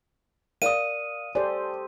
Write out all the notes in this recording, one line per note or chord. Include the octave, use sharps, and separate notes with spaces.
A#4 D5 F5 D#6 D#7
G4 A4 C5 D5 G#5